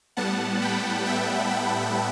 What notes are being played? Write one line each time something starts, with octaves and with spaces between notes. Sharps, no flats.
A2 G3 B3 F#5 A5
G5 B5
E5 G5
G5 B5